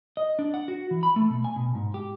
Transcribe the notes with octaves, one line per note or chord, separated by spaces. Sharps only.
D#5
D4
F#5
F#4
E3
B5
A3
B2
G#5
B2
G#2
G4